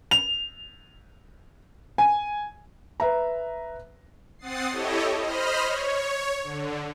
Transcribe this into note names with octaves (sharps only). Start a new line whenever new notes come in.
F7
G#5
B4 E5 A#5
C4 F#5 D#6 A6 C7
E4 G4 A4 C#5 D#5
C5 D#5 B5 F6
C#5
D3